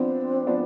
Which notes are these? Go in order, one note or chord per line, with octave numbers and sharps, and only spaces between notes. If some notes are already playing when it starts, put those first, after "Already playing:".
Already playing: F3 B3 C4 D4
F3 B3 D4